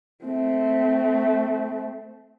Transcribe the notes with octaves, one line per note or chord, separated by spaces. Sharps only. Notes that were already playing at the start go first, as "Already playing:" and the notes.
A3 C4